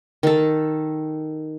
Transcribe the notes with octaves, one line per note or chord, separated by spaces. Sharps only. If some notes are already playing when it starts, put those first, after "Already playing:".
D#3 A4